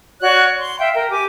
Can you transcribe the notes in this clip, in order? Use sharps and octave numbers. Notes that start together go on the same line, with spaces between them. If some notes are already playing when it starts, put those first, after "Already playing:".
F#4 C#5 D5 F#6
C6
E5 F5 G5
A#4 G5
G4 G#5 D6